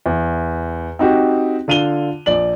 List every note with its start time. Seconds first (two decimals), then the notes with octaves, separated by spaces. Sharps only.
0.06 E2
0.99 C4 D#4 F#4 G4
1.68 D3 F4 D#7 F7 G7
2.26 A#1 D5 F#7